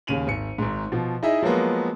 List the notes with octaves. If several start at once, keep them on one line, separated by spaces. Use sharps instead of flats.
D#2 C#3 D#7 F7 F#7
G#1 C#7
G#1 G#2
B2 F3
D#4 E4 G#4 D#5 E5
F3 F#3 G#3 A#3 B3